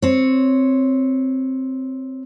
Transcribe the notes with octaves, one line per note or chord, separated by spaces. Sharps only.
C4 C#5